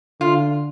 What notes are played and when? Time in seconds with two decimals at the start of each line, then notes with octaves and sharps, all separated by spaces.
0.20 D3 F4